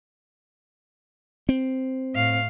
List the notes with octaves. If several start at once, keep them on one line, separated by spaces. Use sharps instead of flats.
C4
A2 F5